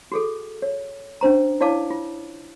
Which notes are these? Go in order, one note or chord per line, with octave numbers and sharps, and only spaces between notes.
F#4 G#4 A4
C#5
C#4 D4 C5 A#5
E4 C#5 D5 F5 A5 D6
F4